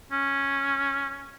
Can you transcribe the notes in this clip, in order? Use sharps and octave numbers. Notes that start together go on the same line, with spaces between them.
C#4